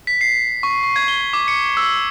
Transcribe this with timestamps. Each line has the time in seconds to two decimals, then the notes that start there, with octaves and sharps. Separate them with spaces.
0.07 B6
0.21 C7
0.63 C#6
0.83 C#6
0.96 G#6
1.08 G7
1.33 D6
1.48 C#7
1.77 E6